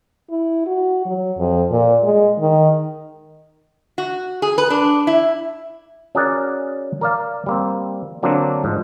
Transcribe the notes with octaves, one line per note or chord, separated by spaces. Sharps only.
E4
F#4
F#3
F2
A#2
G#3
D#3
F#4
G#4
B4
D4
E4
C#4 F#4 G#4 A#4 D5 F#5
A#4 D5 F5
G3 A#3 C4
D3 F#3 A#3 C4 D4
G#2 F3 G#3